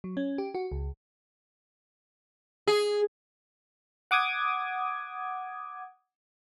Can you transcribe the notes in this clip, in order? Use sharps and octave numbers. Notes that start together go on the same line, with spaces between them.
F#3
C#4
G4
F#4
C#2
G#4
F#5 D6 D#6 G#6